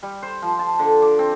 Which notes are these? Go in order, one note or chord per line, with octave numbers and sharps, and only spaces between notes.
G3
C5
F3
A5
D3
D6
C4